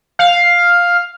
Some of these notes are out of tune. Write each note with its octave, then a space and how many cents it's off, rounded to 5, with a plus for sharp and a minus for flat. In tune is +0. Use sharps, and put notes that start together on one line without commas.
F5 +5